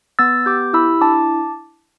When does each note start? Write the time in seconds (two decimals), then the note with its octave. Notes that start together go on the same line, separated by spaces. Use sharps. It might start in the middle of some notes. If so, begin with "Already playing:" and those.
0.19 B3 E6 A6
0.46 G4 D6 G6
0.73 E4 B5 E6
1.01 D4 A5 D6